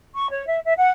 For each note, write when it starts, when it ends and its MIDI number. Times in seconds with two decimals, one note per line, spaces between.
0.15 0.30 85
0.30 0.46 73
0.47 0.58 76
0.65 0.73 76
0.77 0.90 78